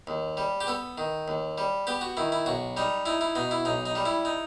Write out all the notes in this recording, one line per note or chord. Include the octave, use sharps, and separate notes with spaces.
D#2
G3
G4
B3 A4
D#3
D#2
G3
B3 G4
F#4
D#3 E4
E4
B1 F#4
G3 D#4
D#4 E4
E4
B2 D#4
E4
B1 D#4
D#4
G3
E4
D#4